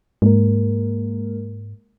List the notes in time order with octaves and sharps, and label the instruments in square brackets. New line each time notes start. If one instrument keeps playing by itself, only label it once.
[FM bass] G#2 [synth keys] G#3 A#3 A#4